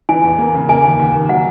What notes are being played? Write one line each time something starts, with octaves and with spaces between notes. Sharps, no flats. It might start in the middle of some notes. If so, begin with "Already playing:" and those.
E3 G#5
E2
A#3
C#3
A#3 G#5
D#2
D#2
D#3
F#3 F#5